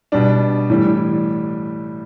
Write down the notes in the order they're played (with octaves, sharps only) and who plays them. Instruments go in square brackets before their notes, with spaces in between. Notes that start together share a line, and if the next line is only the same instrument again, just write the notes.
[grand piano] B2 G3 D4
A2 E3 G3